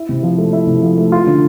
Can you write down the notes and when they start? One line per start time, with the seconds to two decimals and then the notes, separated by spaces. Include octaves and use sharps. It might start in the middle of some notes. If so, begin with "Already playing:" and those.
Already playing: E4
0.09 C3
0.23 F3
0.38 A3
0.53 E4
0.67 C3
0.83 F3
0.98 A3
1.12 F4
1.27 D3